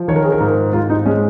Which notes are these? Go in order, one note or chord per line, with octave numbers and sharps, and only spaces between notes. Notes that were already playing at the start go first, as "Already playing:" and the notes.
Already playing: F3
D#3 C#5
A#4
G#4
A#4
G#2
G#2 F4
D#4
G#3 C#4